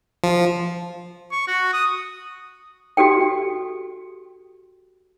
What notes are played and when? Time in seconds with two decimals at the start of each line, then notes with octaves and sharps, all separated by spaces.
0.24 F3
1.31 C#6
1.47 F#4
1.73 D#6
2.97 F#4 G4 A4 G5